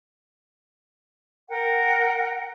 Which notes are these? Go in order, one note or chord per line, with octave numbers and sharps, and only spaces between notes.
A#4 F#5 G5